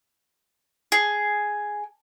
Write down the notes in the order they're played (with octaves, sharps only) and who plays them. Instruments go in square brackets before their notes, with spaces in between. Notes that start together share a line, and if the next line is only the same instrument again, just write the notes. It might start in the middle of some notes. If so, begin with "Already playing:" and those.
[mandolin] G#4